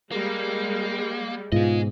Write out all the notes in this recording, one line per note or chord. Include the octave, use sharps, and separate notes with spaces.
G3 G#3 A#3
G#2 B2 F4 G#4 D#5